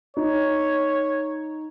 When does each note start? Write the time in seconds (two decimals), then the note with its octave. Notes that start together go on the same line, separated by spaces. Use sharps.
0.17 D#4 C#5